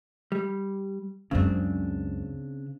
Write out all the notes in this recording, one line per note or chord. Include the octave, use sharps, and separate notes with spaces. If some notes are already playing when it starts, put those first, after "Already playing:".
G3
C#2 F#2 C#3 C4 D4